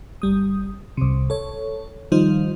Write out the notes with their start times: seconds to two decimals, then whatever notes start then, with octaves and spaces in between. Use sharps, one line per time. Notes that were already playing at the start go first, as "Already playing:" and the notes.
0.22 G1 G3 D#6
0.97 C2 C3
1.30 A4 C#5
2.12 D#3 F3 G3 D#4 F4 C5